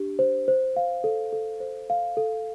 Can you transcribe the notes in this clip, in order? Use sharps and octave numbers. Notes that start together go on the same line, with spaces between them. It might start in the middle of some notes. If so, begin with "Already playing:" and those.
Already playing: D4 G4
C5
C5
F5
A4
A4
C5
F5
A4